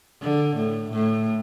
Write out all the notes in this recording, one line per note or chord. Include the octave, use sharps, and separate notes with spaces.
D3
A2
A2